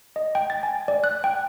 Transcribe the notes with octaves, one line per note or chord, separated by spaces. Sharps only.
D#5
G5
A6
G#5
D5
F#6
G5